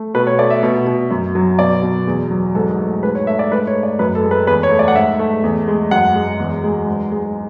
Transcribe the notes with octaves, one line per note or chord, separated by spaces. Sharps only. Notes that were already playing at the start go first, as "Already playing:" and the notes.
Already playing: A3
B2 B4
C#5
A3 D5
E5
B2
B2
F#2
F#3
B2 D5
B2
E2
F#3
G#2 A4
A4
A3
G#2 B4
C#5
A3 E5
D5
G#2 B4
C#5
A3
D5
F#2 B4
A4
G#3
B4
E2 B4
C#5
A3
D5
F#5
G#2 E5
A3
E2
G#3
F#2 F#5
G#3
E2
G#3
G#2
G#3